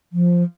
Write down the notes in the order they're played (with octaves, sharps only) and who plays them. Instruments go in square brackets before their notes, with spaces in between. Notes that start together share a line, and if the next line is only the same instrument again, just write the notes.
[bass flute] F3